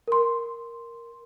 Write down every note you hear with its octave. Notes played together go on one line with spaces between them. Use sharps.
A#4 C6